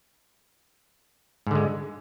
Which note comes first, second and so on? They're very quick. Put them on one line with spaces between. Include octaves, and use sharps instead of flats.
G#2 D3 G#3